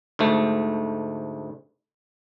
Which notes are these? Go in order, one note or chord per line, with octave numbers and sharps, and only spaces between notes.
D2 G#2 A3